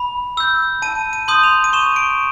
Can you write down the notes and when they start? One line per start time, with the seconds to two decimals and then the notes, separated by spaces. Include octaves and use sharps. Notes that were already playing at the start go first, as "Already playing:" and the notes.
Already playing: B5
0.37 E6 G6
0.82 A5 D#7
1.13 D#7
1.28 C6 D#6 G6
1.43 F7
1.64 D#7
1.73 C#6 E7
1.96 D7